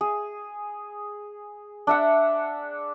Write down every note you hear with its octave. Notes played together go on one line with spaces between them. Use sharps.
G#4
D4 E5 F#5